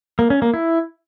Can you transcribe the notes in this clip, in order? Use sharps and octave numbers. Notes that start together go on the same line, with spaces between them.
A#3
C#4
A#3
E4